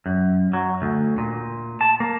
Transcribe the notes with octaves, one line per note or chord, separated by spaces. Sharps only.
F#2
F#3
D2
A#2
A5
A#3